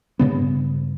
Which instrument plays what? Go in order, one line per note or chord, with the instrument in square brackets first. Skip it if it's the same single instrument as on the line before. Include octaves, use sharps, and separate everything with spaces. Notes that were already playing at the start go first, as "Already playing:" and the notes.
[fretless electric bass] G2 C#3 B3